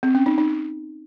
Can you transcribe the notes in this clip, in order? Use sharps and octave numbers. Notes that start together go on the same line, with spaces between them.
C4
C#4
D#4
D#4